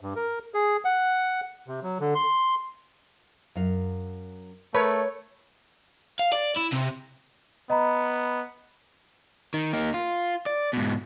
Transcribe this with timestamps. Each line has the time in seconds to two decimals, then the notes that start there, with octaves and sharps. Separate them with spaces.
0.01 G2
0.16 A#4
0.54 G#4
0.85 F#5
1.68 C3
1.83 F#3
2.00 D3
2.15 C6
3.55 F#2 F5
4.74 A3 A#4 B4 C#5 B5
6.19 F5
6.32 D5
6.56 E4
6.72 C3
7.70 B3 D#5 A#5 B5
9.54 D#3
9.73 A#3 D#4
9.94 F4
10.46 D5
10.73 G#2 B2